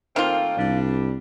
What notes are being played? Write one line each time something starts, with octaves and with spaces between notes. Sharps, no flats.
D#3 A3 A#3 C4 F4
C2 G3 D4